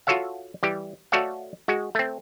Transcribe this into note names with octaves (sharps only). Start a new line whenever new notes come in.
F4 F#4 A4 C#5 E5 F5
E3 G3 G4
A3 F#4 A4 C#5 D5 F5
G#3 F#4
A3 C4